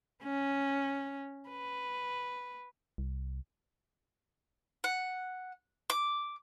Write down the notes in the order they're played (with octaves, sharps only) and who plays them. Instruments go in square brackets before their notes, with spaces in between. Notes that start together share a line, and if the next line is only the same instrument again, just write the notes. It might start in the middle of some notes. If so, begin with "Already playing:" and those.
[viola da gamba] C#4
B4
[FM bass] C2
[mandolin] F#5
D6